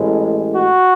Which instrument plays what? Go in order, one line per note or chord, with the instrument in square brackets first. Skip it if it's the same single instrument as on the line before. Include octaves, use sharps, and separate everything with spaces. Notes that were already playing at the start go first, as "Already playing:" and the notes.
Already playing: [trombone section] A1 A2 G#3
F#4